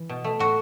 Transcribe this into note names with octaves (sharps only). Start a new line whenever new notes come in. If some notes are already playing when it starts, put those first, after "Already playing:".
Already playing: E3
B2
A3
A2 F#4